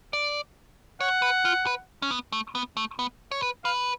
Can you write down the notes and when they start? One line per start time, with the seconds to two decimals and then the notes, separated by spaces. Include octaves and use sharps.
0.13 D5
1.00 C#5 F#5
1.22 B4
1.45 F4
1.66 B4
2.02 C#4
2.11 B3
2.32 A3
2.55 B3
2.77 A3
2.99 B3
3.32 C#5
3.42 B4
3.64 B4 F5